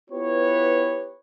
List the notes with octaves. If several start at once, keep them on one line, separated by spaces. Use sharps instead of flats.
B3 E4 F4 G4 B4 C#5